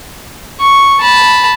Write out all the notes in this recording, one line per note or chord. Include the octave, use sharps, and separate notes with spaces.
C#6
A5 B5